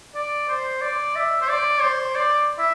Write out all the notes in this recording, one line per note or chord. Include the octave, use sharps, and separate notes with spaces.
D5
C5
D5
E5
C5
D5
C5
D5
E5